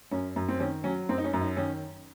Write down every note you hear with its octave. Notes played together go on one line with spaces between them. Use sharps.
F#2 C#4
F#2
C4
D#3 C#4
F#3 C#4
F#2 C4
D#4
C#4
F#2
D#4
D#3 C#4